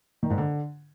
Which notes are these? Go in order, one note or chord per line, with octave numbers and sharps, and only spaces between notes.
D#3
G#2
D3